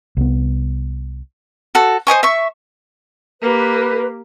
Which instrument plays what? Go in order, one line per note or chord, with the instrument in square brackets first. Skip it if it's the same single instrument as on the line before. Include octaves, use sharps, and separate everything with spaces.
[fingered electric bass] C2 B3
[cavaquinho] F#4 A4
C5 D#5 G#5 C#6
E5 C#6
[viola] A#3 G4 [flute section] B4